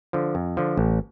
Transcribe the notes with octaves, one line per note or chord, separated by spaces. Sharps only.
D3 F3
F2
D3 F3
A1